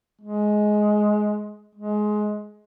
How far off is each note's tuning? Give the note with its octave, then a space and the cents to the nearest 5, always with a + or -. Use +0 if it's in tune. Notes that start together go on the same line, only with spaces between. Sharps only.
G#3 +15
G#3 +20